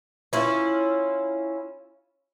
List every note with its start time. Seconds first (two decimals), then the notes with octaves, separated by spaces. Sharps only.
0.33 C#4 E4 F4